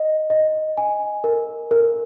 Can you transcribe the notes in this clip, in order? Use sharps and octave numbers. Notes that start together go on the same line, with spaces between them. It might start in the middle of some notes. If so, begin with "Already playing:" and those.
Already playing: D#5
D#5
G#5
A#4
A#4